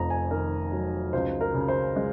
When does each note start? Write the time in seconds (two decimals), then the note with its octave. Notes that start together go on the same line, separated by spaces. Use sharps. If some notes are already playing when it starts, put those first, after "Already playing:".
Already playing: F1 F2 A#5
0.10 G#5
0.31 D#3 A#4
0.72 F#3
1.13 C#2 C5
1.41 A#4
1.54 C#3
1.68 C5
1.96 G#3